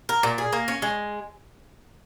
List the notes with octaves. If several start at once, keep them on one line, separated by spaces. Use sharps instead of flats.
A#4
A#2
G#4
A#3
C#4
G#3